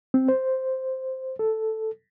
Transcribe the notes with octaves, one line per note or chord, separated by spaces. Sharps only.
C4
C5
A4